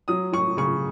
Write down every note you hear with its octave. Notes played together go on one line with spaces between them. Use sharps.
F#3 D#6
F#3 C#6
C#3 C#6